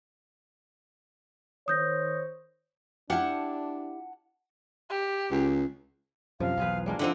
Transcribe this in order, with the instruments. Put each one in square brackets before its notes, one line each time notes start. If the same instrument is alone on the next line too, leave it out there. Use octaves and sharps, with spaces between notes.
[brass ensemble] D#3 C5 C#5 [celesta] D#6 G6 A#6
[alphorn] D4 [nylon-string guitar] E4 G4 [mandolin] F#5 A5 F6
[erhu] G4
[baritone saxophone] C#2
[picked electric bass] F#2 C3 [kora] F3 [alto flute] F5
[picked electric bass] B1 E2 [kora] F4 G#4 B4
[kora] G3 A#3 D4 [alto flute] G#3
[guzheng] D3 C4 D#4 [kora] F3 E4 [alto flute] F#5